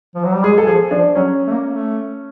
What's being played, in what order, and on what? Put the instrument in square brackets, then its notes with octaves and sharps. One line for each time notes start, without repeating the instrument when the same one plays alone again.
[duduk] F3
F#3
G3
[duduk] G#3 [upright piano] G#4
[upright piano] A4
[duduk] F3 [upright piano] G#4
[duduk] F3 [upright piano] D4
[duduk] F#3 [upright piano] C#4
[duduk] A3
A#3
A3